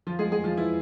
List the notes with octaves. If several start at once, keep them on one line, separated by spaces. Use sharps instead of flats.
F3 F4
G#3 G#4
G#3 G#4
F3 F4
E3 E4